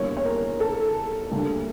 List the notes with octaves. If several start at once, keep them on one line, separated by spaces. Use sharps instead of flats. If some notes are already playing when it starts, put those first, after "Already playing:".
Already playing: E2 D3 G3 A#3 C#5
C#5
A#4
A4
D2 D3 G3 A#3